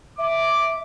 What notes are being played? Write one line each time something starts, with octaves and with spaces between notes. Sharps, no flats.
E5 D6